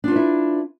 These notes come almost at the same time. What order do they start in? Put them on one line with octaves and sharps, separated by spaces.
D4 F4 B4 E4